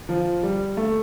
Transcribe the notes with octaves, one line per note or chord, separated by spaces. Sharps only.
F3
G3
A3